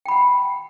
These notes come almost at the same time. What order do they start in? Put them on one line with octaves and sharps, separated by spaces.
G5 B5 F#5